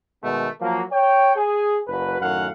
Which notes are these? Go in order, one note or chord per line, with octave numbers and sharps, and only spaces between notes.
B2 D#3 G#3 A3 B3
F3 F#3 A#3
C#5 G5
G#4
F#1 F#4 B4
F#2 A2 D#3 F5 F#5